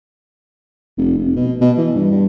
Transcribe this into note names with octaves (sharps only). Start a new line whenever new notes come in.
F1
F1
B2
B2
E3
G2
G2